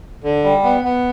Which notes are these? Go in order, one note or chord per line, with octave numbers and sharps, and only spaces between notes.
D3
G3
B3
B3